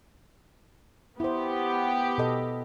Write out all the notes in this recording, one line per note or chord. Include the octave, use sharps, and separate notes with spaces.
B3 E4 G4 C5
B2 A4 D#5